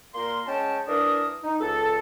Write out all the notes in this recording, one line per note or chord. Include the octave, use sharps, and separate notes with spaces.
A#2 A#3 A#4 C6
G#3 C#4 G5 A5
E3 D4 A#4 A5 D#6
D#4
C#2 A4